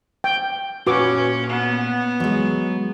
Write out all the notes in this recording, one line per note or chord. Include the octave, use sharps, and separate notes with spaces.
G5
A#2 C#4 F#4 B4 D6
B3
F#3 G#3